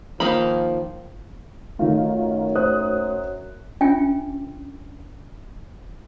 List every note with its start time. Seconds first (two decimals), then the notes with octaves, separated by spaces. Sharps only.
0.20 D#3 F3 A#3 B5
1.79 F#2 D#3 A3 D#4 F4
2.55 C5 D#6 F#6
3.81 C#4 D4 F4 E5 G5 G#5